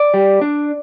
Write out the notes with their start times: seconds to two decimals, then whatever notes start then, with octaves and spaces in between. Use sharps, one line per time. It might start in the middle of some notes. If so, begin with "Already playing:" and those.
Already playing: D5
0.14 G3
0.41 D4